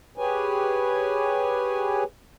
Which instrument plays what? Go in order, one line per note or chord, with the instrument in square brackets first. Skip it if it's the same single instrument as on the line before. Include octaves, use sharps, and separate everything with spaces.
[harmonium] G4 G#4 B4 C#5 G#5